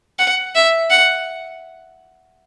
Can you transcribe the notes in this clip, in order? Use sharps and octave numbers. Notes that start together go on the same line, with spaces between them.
F#5
E5
F#5